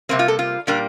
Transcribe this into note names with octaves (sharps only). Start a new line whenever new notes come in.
C3 G3 A#3 C4
F4
A4
F4
A#2 G3 A#3 D4